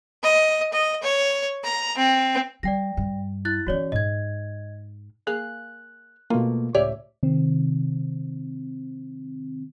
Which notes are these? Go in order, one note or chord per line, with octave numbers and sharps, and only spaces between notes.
D#5
D#5
C#5
A#5
C4
G3 D5 G5 A#6
G2
E4 F#6 A6
E3 C#4 F#4 C#5 D5
G#2 D#5 G#6
A#3 G#4 F5 F#6
B2 A3 A#3 F4
C#2 A2 G4 C#5 D5 E5
C3 D#3 C4